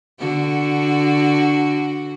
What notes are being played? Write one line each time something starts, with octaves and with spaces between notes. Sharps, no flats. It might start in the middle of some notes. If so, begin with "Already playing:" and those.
D3 F#4